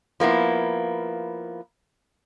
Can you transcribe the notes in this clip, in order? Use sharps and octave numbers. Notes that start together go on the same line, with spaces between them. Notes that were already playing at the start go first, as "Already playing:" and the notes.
F3 A#3 B3 E4